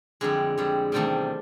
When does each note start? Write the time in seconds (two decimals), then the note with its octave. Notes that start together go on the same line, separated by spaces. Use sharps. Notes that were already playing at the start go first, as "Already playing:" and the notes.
0.21 F2 D3 G3 G#3
0.58 F2 D3 G3
0.92 E2 C3 D#3 G3 A3